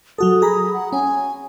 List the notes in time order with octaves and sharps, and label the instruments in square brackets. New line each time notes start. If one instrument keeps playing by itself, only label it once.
[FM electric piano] F#3 F#4 A4 [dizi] D#6
[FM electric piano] G#4 A#5 B5
[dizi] F#5
[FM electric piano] C#4 [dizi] G#5